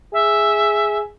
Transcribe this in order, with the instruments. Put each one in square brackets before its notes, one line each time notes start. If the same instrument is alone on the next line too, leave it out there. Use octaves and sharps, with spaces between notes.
[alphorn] G#4 [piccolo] E5